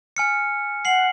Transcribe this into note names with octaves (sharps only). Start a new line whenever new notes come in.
G#5 F6 C#7
F#5 C7 F#7